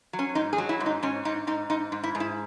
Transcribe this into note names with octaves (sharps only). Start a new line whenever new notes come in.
F#3
C#4
G#2 D#4
G#4
F#3
E4
G#2
D#4
G#2 C#4
G#2 D#4
G#2 D#4
G#2 D#4
G#2
E4
G#2
E4